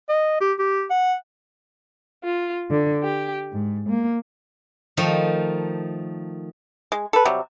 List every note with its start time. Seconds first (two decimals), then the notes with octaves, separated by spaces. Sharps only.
0.09 D#5
0.41 G4
0.59 G4
0.90 F#5
2.25 F4
2.70 D3
3.04 G4
3.52 G#2
3.89 A#3
4.97 D#3 F3 A3 D#4
6.92 G#3
7.13 A4 B4
7.25 C3 F#3 G3